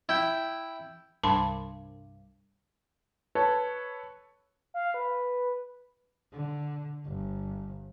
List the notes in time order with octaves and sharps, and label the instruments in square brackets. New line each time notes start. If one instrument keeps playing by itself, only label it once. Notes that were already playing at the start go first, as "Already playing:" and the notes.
[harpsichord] E4 G5
[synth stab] C2 G2 [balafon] A5 B5 C6
[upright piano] A4 B4 C#5 A5
[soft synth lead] F5
B4
[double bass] D3
G1